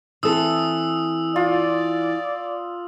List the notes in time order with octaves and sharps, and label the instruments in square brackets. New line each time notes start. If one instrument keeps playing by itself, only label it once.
[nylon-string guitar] E3 C4 A4 [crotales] D#6 E6
[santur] F4 [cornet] D5